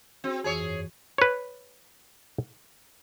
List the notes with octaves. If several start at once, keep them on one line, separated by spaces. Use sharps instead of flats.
C4 F#4 G#4 C6
F2 E3 G#4 C#5 E6
G2
B4 C#5